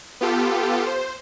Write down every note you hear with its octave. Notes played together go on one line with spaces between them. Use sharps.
B3 F4 G4 A4
C5